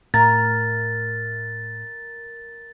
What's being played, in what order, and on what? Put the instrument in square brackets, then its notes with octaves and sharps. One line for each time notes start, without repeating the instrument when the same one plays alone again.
[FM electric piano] A2 [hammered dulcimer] A#4 [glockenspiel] A6